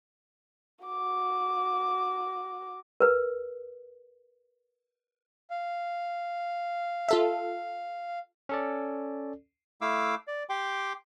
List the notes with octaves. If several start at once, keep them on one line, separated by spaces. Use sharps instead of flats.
F#4 D6
A#4 B4
F5
F4 A4 E5
C#4 A4 D5
A3 E4 F5 D6 E6
D5
G4 G5 C6 D6